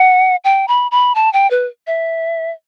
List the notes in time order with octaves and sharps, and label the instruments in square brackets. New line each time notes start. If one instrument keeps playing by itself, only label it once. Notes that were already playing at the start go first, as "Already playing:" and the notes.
Already playing: [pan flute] F#5
G5
B5
B5
A5
G5
B4
E5